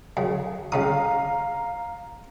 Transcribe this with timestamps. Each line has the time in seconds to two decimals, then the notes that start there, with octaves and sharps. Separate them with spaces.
0.17 F#2 C#3
0.72 C2 C#3 F5 A#5 D#6